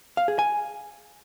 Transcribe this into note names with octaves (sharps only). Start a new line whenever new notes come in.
F5
G#4
G#5